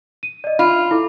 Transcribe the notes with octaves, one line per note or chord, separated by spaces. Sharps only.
D#7
D5 D#5
F4 B5
E4 A4 D6